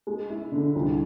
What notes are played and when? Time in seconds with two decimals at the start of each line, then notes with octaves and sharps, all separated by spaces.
0.07 G#3
0.30 E4
0.52 D3
0.75 C2